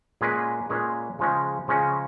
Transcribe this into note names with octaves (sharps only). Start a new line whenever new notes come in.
A#2 G#3 C#4 G#4 B4
A#2 G#3 C#4 G#4 B4
C#3 F3 G#3 C#4
C#3 F3 G#3 C#4